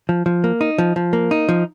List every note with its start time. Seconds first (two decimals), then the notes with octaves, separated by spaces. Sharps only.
0.09 F3
0.26 F3
0.44 A#3
0.61 D#4
0.78 F3
0.96 F3
1.13 A#3
1.31 D#4
1.49 F3